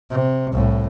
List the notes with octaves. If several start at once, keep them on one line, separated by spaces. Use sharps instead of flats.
C3
C2 A2